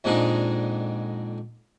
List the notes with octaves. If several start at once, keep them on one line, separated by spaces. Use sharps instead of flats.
F2 A#2 D3 G#3 D#4 G#4